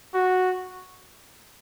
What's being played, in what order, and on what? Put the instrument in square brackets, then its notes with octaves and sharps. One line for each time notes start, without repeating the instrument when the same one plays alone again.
[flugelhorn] F#4